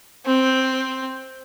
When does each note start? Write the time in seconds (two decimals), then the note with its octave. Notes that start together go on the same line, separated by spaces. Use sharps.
0.25 C4